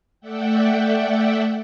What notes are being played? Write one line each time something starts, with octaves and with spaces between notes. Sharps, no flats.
A3 D5 E5 F#5 G5